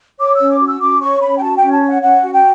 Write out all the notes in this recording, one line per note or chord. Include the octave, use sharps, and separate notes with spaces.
C#5 D6
E6
C#4
D6
F#4
E6
C#4 D6
C#5 C#6
C#4 B5
G5
F#4 A5
C#4 G5
A5
C#5
F#5
C#4 F#5
F#4
G5